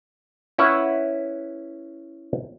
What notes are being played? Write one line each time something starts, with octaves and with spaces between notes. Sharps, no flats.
C#4 E4 B4 F#5